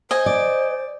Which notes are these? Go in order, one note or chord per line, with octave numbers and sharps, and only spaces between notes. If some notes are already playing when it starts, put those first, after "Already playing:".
C5 D#5 G#5
D5